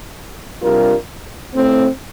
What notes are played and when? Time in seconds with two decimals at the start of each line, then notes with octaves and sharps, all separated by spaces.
0.61 C3 G3 D4 F4 A#4
1.55 A2 A3 C4